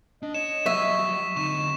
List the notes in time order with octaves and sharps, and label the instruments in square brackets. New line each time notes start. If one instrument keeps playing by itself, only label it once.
[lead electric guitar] D4 [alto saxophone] D#5
[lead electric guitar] C#5 [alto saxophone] D#5 [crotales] E7
[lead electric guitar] F#3 G3 [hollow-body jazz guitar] E5 [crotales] C#6 B6
[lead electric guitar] D3 C4 [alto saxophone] D#4 [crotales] C#6 E7